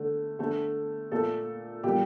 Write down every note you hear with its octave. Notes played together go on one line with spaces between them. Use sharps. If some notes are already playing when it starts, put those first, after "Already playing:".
Already playing: D3 A3
D3 A3
A#2 A3 A4
A#2 G3 G4